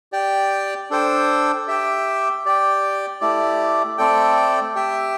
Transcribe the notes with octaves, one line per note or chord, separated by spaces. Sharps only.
G4 D5 G5
D4 A4 C5 G5
G4 E5 G5
G4 D5 G5
A3 E4 G4 D5
A3 C4 A4 D5 G5
G4 E5 G5